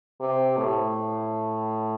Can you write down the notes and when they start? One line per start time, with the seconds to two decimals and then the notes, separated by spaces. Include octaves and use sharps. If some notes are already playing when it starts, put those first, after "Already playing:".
0.21 C3
0.57 A2